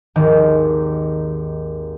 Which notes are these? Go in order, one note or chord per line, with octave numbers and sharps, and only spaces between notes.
G#1 D#2 D#3